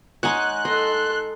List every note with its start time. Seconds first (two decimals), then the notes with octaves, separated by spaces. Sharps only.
0.23 G#3 D#4 C#5 F#5 G#5 F#6
0.65 A4 D#5 C6